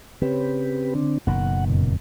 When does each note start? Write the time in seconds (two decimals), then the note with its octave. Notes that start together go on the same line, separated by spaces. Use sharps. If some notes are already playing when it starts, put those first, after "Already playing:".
0.22 C#3 C4 G4 B4
0.95 D3 C4 D4
1.27 F#1 B2 D#3 F#5
1.70 F2 A#2 C#3